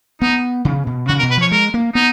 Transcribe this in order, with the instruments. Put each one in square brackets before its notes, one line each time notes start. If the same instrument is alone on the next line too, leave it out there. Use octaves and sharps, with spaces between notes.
[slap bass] B3 [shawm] D#4
[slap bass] C#3
B2
[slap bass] C#3 [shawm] F#4
[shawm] A#4
[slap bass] B2
[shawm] B4
[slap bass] F3 [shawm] C#5
[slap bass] G#3 [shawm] A#4
[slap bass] A#3
[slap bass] B3 [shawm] D#4